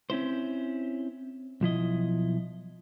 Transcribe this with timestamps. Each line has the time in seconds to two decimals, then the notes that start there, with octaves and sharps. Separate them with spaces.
0.10 C4 C#4 E4 C5
1.61 B1 F3 E4 D#5